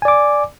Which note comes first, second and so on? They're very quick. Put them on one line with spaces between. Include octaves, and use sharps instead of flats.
G#5 D5 D6